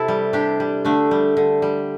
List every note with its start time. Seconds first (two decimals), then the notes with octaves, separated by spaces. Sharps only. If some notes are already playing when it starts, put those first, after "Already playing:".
Already playing: C3 E4 A4
0.08 G3
0.33 C3 D4 G4
0.60 G3
0.85 D3 A3 D4
1.11 G3
1.37 D3
1.62 G3